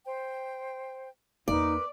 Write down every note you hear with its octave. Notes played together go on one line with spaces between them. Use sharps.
C5 G5
E2 A#3 D#4 A#4 B4 D5